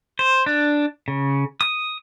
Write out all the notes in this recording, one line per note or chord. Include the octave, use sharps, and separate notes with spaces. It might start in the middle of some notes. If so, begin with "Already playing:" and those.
C5
D4
C#3
D#6